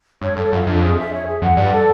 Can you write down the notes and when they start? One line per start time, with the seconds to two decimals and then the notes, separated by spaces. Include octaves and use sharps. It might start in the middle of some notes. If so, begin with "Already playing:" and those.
0.21 G2 C#5
0.36 G2 A4
0.51 F#2 F4
0.66 F2 D4
0.82 G#4
0.97 E5
1.12 C#5
1.27 G#4
1.42 F2 F#5
1.57 G2 D5
1.72 A4